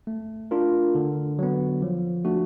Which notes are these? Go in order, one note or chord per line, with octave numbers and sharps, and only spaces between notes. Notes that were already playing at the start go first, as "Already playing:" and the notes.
A3
D4 F4 A#4
D3
F#3 B3
F3
A3 D4 F#4